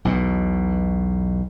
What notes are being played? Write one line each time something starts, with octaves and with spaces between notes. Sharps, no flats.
B1 E2 B2